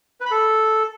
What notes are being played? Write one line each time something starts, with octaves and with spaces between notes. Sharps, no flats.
B4
B5
A4